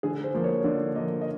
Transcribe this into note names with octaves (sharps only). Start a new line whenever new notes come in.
D3 G#4
C5
F3 A#3
C#5
D3 D5
F3 A#3 D#5
D#5